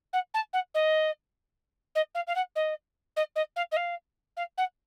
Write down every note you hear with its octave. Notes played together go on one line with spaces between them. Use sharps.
F#5
A5
F#5
D#5
D#5
F5
F5
F#5
D#5
D#5
D#5
F5
D#5
F5
F5
F#5